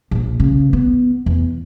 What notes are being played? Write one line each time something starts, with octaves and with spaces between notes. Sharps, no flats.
A#1 A#2
C#3
B3
E2